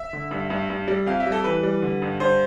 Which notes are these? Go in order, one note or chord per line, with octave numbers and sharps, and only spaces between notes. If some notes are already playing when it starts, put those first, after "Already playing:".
Already playing: E5
D3
G2
G2
G2
G3
F2 F5
E5
G3
A4
E3 B4
G3
D3
G2
G2 C5